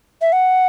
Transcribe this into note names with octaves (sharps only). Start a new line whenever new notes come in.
E5
F#5